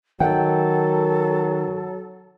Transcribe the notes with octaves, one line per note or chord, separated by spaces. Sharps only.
D#3 F#3 A4 F#5 G5